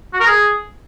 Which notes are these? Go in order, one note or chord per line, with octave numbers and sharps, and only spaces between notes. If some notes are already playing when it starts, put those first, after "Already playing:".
F#4
A#4
G#4